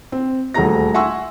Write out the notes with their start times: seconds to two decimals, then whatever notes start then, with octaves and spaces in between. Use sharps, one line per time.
0.12 C4
0.54 D#1 D2 A3 G#4 A#5 A#6
0.94 E5 F#5 G#5 C6 C#6 E6